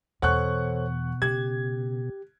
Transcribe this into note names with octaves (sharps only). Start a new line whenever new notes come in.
E2 B2 A4 C5 C#5 F#5 C#6 F#6
C#3 G4 G#6